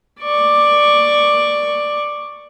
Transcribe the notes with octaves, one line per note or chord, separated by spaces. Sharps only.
D5 C#6